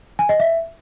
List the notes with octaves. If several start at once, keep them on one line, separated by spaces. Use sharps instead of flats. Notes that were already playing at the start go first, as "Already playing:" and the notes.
G#5
D#5
E5